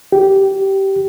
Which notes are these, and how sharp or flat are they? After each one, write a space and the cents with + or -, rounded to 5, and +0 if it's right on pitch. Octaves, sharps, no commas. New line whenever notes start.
G4 -15